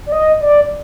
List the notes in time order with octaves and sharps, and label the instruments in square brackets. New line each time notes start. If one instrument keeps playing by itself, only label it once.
[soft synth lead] D5
D#5
D5